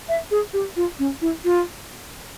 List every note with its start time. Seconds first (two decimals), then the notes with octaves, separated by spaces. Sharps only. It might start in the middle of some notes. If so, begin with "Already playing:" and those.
0.09 E5
0.31 G#4
0.53 G4
0.76 F4
0.99 C#4
1.21 E4
1.45 F4